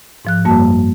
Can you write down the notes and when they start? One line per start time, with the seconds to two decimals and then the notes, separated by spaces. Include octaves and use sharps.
0.25 G#2 F3 F#6
0.45 F#2 G3 A#3 F#4 A5